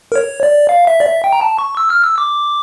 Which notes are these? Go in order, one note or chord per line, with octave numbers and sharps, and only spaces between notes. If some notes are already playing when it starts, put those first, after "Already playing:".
A#4
C#5
D5
F5
E5
D5
E5
G5
A#5
A5
C#6
E6
F6
E6
D6